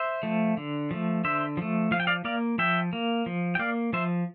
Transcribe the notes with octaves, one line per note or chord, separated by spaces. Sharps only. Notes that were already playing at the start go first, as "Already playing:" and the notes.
Already playing: C5 E5
F3 A3
D3
F3 A3
D3 C5 E5
F3 A3
F3 F5
G5
D5 F5
A#3 D5 F5
F3 E5 G5
A#3
F3
G5
A#3 D5 F5
F3 C5 E5